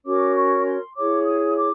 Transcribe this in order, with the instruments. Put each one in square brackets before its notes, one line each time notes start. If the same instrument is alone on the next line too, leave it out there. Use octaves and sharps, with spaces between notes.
[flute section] C#4 F#4 A#4 C#5 D6
C#6
C6
E4 G#4 C#5 D6
D#6
D6